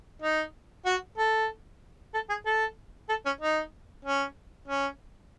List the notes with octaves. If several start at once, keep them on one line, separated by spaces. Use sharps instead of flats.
D#4
F#4
A4
A4
G#4
A4
A4
C#4
D#4
C#4
C#4